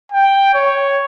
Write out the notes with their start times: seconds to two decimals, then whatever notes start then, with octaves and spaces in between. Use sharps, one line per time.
0.12 G5
0.54 C#5